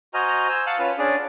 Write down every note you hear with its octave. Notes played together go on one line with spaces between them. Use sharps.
F#4 C5 D#5 G#5 A#5 F6
C5 G#5 E6
F5 F#5 A5 E6 F#6
C#4 F4 B4 F6
C#4 D4 G#4 D5